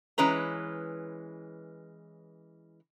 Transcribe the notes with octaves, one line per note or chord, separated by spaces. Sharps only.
E3 G#3 C#4 B4 A#5